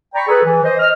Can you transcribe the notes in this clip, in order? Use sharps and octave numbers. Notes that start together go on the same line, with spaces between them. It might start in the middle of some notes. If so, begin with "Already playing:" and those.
D5 G5 A#5 B5 C#6
G#4 A4 B4
E3
C5 D#5
D#5 F6